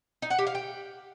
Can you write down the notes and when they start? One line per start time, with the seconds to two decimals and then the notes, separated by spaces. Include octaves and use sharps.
0.22 D#4
0.30 F#5
0.39 G4
0.47 F5
0.55 G5